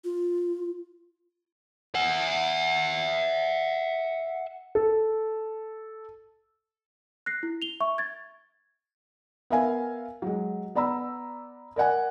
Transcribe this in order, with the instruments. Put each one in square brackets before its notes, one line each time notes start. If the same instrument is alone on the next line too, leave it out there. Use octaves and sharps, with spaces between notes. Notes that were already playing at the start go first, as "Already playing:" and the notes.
[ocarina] F4
[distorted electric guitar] E5 F#5
[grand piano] A4
[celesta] F#6 A#6 C7
E4
F7 G7
E5 C#6
G#6 A6
[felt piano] B3 A#4 E5 F5 G#5
F#3 G#3
B3 D5 A#5 B5 E6
A#4 D5 F#5 G#5